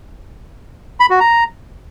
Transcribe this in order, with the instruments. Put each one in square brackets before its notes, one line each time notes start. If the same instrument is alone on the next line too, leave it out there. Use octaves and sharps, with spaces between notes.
[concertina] B5
F#4
A#5